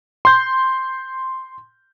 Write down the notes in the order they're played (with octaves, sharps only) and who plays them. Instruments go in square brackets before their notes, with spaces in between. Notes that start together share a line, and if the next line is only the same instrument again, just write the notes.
[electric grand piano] C6 G6